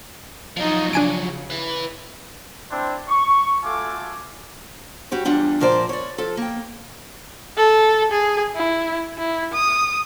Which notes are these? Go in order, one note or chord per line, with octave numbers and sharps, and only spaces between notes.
F3 F#3 D#4 F4
C#3 D4 G#5 D7
E4 B4
C4 D4 E4 C5
C#6
A3 F4 F#4 A4 G#5 D6
G3 F#4 G4 C#5
E2 G3 D4 F4 F#5
A#2 F3 A#4 C5 D5
C#5 D5
F3 A4
A#3 G5
A4
G#4
E4
E4
D#6